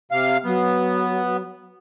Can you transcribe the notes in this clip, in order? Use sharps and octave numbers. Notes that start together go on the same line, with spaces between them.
C3 F5
F#3 B3